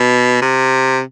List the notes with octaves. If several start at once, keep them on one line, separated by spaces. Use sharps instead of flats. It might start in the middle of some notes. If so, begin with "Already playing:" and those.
Already playing: B2
C3